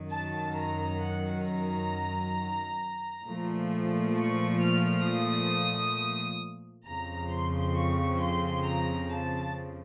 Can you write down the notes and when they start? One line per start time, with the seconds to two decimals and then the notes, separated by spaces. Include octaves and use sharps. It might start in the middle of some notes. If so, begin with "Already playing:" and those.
Already playing: F#2 D#3 F#3
0.10 A5
0.56 A#5
1.01 F#5
1.46 A#5
3.26 A#2 F3 A3
4.16 C#6
4.61 F6
5.06 D#6
6.87 F2 C#3 F3 C4 A#5
7.32 C6
7.77 C#6
8.21 C6
8.66 A#5
9.12 A5